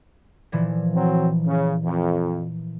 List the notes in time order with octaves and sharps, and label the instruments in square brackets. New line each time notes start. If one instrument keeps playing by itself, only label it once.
[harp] A#2 E3 F3
[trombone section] F#3 C4
C#3
F2